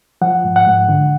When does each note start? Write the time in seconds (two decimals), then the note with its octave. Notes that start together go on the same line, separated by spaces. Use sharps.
0.21 F3 F#5
0.44 G#2
0.56 F#5
0.67 G#2
0.89 D3